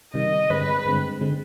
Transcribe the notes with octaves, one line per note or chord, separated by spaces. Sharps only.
C3 D#3 G3 D#5
G2 D3 G#3 C4 B4
G2 D3 G#3 C4
D3 G#3 C4